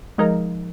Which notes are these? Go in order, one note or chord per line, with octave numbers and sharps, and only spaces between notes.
F3 G#3 D#4 A#4